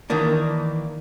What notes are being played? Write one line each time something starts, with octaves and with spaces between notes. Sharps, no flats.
D#3 E3 A#3 D4